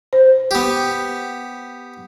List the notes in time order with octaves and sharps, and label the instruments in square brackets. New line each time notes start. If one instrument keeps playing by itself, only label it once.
[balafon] C5
[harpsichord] B3 G4